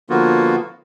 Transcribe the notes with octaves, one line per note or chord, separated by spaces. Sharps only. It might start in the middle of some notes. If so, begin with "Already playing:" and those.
D3 F3 A#3 B3 F4 F#4